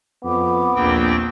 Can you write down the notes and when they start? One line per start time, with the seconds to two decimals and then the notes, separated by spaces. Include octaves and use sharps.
0.24 F2 B3 D6
0.76 A#1 D#2 C4 G5